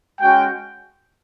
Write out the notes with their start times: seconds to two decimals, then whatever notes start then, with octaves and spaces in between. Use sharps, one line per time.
0.20 G#3 C#4 F#4 G5